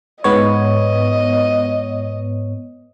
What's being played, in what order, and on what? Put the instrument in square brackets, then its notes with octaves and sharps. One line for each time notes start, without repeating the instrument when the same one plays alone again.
[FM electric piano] G#2 B3 C#5 [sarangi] D#5